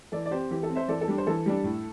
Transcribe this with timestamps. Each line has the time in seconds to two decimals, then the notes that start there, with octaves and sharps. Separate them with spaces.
0.12 E3 A4 D5
0.26 D5
0.31 C4 G4 C5
0.51 E3 G4
0.63 A4
0.70 C4
0.75 C5 E5
0.88 E3 A4 D5
1.01 A4
1.08 G3 D4
1.18 C5
1.27 E3 A4
1.46 G3 D4
1.64 A2